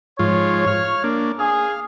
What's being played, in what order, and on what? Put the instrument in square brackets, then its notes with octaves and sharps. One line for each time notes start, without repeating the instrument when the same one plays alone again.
[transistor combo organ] G#2 F3 F4 [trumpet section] C#5
[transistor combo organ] F5 F6
A#3 D4
[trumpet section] G#4 [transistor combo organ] F5